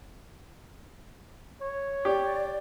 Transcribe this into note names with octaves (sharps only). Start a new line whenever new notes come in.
C#5
G4 D5